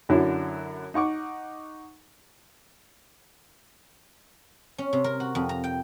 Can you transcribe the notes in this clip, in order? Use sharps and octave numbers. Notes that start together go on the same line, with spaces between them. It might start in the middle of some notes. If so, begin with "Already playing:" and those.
F#2 D3 F#3 E4
D#4 F#5 C#6 D6
C#4
C3
A#4
F#4
F2
A#5
G5